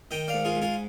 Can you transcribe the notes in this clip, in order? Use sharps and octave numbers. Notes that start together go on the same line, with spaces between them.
D#3 D#5 G5
D5 F5
G#2
F4 G#4
G#2
F4 G#4